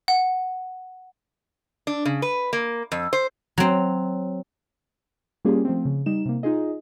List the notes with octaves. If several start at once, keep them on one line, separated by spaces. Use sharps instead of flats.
F#5
D4
C#3
B4
A#3
F2
C5
F#3 C4
G3 A#3 C#4 F4 G4 G#4
F3 A3 C4
C#3
G3 D#4 E7
C3 A#3
D#4 F4 G#4 D#5